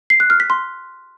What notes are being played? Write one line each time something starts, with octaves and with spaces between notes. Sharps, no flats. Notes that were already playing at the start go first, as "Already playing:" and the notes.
C7
F#6
F6
B6
C6